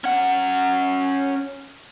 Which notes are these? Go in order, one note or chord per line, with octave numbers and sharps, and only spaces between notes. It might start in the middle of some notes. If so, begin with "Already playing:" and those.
C#4 F#5